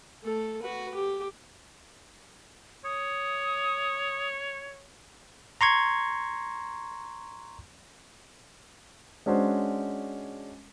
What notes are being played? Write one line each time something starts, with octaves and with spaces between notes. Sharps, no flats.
A3 A4
F#4 B4
G4
C#5 D#6
A#5 C6 C#6 G#6
G#3 C#4 D4 F#4 C5